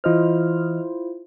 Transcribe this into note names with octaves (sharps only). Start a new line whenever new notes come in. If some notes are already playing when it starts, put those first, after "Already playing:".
E3 E4 F4 C5 D#5 F6